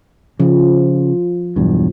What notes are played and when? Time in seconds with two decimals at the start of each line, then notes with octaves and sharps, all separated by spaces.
0.40 C#3 F3
1.56 B1 E2 G2